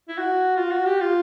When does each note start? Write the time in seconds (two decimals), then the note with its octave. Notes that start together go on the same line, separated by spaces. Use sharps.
0.09 E4
0.18 F#4
0.57 F4
0.71 F#4
0.86 G4
1.01 F4